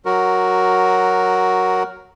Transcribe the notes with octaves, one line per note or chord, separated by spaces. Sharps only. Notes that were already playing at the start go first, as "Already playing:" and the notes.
F#3 F#4 A#4